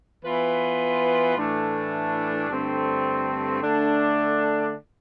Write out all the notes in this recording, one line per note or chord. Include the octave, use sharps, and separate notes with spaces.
E3 B3 F4 B4
A2 E3 A3 D4
G2 D3 A3 C4
D3 A3 D4